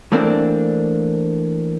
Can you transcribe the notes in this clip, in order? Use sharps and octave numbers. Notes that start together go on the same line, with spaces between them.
E3 A3 A#3 C4 D4